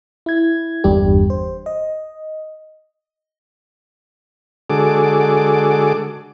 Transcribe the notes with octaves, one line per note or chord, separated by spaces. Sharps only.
E4 G#6
G1 E2 G2 D4 G4
C5
D#5
D3 G#3 F#4 G#4 A4 D6